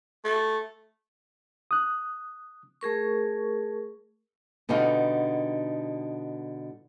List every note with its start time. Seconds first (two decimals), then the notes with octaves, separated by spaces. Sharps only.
0.25 A3
1.71 D#6 F#6
2.81 A3 G#4 A#4 C#6
4.69 B2 D3 G3 D#4 F5 F#5